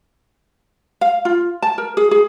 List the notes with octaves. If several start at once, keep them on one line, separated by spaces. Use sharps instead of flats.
F5
F4
A5
A#4
G#4
G#4